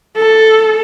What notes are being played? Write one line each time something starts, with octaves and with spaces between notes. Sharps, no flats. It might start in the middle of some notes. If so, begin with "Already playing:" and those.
A4